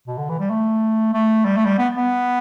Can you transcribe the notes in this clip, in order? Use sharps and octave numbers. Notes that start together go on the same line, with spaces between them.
B2
D3
E3
G3
A3
A3
G3
A3
G3
B3
B3